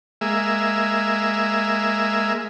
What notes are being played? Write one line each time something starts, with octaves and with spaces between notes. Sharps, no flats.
G#3 A#3 E5